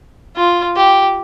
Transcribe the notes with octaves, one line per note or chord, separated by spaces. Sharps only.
F4
G4